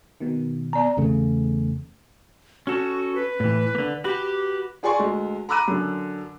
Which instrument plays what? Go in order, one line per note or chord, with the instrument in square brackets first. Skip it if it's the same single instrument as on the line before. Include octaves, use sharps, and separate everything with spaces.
[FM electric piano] B2 D#3
[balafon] B3 D5 [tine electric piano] A#5
[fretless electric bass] E2 C#3 A3
[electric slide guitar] C#4 A4 [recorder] F#4
[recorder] B4
[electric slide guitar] A2 E3
D3 A#3
[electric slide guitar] F#4 B4 [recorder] G4
[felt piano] F4 G#4 D5 G#5 C6 C#6
D2 G#3
A#5 B5 D6 E6 F#6 D#7
F#2 D3